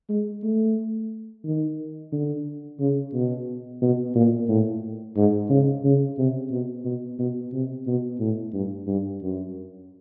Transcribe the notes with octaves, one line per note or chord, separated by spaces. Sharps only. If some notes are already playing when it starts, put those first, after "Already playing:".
G#3
A3
D#3
D3
C#3
B2
B2
A#2
A2
G#2
C#3
C#3
C3
B2
B2
B2
C3
B2
A2
G2
G2
F#2